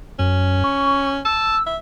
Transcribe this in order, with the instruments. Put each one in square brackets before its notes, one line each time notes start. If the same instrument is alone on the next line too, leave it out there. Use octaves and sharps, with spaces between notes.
[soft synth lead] F#2 [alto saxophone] C#4
[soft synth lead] C#6
[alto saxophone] A5 [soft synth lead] E6
[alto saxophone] E5